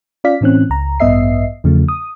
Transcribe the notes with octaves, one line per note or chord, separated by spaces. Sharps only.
C#4 F4 D5 F5 B6
A2 E3 C4 C#4 F#6
C#2 A#5
A1 G2 B3 D#5 E5 C7
E2 C#3 F3 A3
D#6